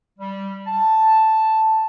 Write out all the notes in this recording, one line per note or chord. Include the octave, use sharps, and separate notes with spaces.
G3
A5